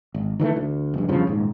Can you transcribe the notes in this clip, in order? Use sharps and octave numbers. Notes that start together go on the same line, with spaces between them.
G#1
D#3 E3 G#3 A3
D2
F1 G2
E2 G2 C#3 F3
D#1 G#2